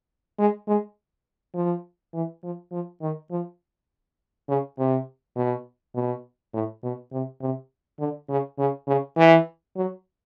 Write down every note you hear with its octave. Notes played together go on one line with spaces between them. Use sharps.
G#3
G#3
F3
E3
F3
F3
D#3
F3
C#3
C3
B2
B2
A2
B2
C3
C3
D3
C#3
C#3
C#3
E3
F#3